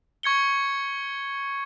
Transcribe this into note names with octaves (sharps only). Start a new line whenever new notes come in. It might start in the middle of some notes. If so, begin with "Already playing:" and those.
C#6 G#6 C#7 G7